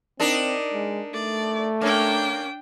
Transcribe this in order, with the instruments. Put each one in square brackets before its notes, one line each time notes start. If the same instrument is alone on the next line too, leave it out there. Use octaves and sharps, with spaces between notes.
[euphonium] C4 [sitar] D4 D#4 A#4
[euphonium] G#3
[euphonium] A3 [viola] D5
[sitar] A#3 C#4 [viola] D4 G5